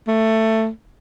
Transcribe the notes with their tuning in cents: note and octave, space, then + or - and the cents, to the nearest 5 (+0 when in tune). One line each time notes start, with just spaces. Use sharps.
A3 +15